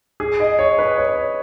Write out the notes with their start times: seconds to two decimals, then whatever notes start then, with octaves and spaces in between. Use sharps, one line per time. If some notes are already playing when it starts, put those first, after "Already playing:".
0.20 G#4
0.40 D#5
0.59 C#5
0.78 B4
0.98 C#5